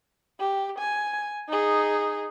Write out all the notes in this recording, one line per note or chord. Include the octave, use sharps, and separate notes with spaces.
G4
G#5
D#4 G#4